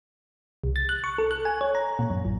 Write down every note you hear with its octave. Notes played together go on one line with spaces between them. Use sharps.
C2
A6
F#6
C#6
A4
F#6
G#5
C#5
A#5
A#2
F#2
A1